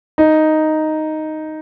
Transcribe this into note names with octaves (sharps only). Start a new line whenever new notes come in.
D#4